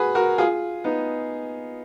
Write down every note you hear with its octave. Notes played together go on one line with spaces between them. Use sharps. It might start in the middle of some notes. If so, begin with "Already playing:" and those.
Already playing: F#4 G#4 B4
F#4 A#4
F4 G#4
B3 D#4